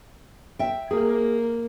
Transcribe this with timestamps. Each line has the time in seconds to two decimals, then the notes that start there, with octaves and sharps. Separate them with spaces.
0.59 E5 G5
0.91 A#3 G#4